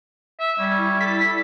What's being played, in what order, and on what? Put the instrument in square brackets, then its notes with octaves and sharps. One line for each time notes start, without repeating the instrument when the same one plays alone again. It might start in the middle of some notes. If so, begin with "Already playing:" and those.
[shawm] E5
[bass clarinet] G3 [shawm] C#4
[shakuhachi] E4
[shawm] A4 [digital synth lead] B6